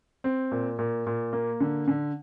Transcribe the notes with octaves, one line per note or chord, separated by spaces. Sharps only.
C4
A#2
A#2
A#2
A#3
D3
D3